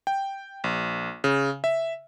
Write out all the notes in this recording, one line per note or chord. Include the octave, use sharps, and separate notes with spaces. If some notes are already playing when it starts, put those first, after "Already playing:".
G5
A#1
C#3
E5